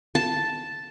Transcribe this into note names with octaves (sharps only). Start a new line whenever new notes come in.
A5